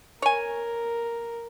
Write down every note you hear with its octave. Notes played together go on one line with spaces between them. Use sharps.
A#4 C#5 G#5